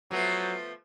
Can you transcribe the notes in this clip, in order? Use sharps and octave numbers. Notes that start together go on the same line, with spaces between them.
F3 F#3 A3 B3